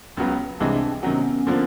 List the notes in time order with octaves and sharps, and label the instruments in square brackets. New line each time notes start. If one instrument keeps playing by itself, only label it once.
[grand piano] C#2 C#3 F#3 B3
[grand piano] C2 C3 E3 G#3 [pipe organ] C4 D4
[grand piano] C3 D#3 F#3 [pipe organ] B3 C#4
[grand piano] D3 F3 A#3